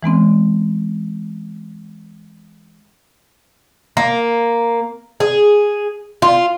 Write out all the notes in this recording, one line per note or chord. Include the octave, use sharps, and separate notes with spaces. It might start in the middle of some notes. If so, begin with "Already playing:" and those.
E3 G#3 B3 C4
A#3
G#4
F4